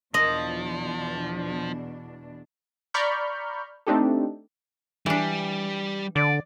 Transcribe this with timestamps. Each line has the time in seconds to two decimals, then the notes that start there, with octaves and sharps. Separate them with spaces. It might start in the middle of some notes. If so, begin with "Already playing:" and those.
0.14 E2 B2 F3 D4 D#5
2.94 D5 A#5 B5 C#6 F6 G6
3.87 A3 C4 D4 D#4 G4 A4
5.06 E3 G3 D4
6.16 D3 D5